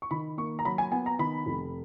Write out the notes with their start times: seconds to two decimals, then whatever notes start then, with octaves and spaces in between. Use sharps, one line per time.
0.02 C#6
0.11 D#3 B5
0.38 A#3 C#6
0.59 A#5
0.65 F#3 B5
0.78 G#5
0.91 B3 G#5
1.06 A#5
1.19 D#3 B5
1.46 F1